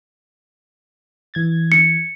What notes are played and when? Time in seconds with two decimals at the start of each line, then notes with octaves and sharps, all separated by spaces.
1.34 E3 G#6 A6
1.72 C#7